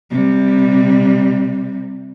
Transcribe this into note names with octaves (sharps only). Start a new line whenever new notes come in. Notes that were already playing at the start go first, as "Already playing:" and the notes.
C3 G3